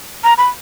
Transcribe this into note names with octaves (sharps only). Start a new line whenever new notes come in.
A#5
B5